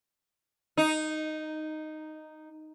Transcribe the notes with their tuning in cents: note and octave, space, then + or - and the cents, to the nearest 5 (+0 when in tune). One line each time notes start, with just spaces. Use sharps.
D#4 -5